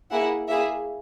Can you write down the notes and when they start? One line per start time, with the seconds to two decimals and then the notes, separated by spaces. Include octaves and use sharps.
0.11 A#3 E4 G#4 F#5
0.48 A#3 E4 G#4 E5